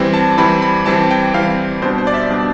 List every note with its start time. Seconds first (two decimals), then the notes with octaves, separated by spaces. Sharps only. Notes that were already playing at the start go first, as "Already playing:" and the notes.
Already playing: E3 G3 C4
0.14 A5
0.38 E3 G3 C4 B5
0.62 B5
0.86 E3 G3 C4 A5
1.11 G5
1.34 E3 G3 C4 F5
1.82 B2 G3 D4 C5
1.98 C5
2.07 D5
2.14 E5
2.30 B2 G3 D4